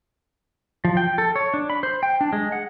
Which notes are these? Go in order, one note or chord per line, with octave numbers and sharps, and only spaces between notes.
F3
G5
A4
C#5
D4
B5
C5
G5
D4
G#3
F#5